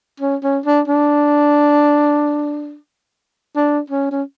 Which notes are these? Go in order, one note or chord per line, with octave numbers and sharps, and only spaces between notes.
C#4
C#4
D4
D4
D4
C#4
C#4